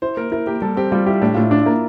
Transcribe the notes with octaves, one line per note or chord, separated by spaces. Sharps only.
E4 C5
A#3 A#4
E4 A#4
A#3 G4
G3 A4
C4 G4
G3 F4
E4 G4
A2 D4
A2 F4
E4
D4
A#3 E4